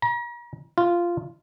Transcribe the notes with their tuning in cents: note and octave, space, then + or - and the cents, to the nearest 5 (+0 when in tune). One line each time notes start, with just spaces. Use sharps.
A#5 +40
F4 -10